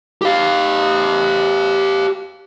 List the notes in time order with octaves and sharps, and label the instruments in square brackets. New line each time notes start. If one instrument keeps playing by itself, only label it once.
[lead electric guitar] G4 F5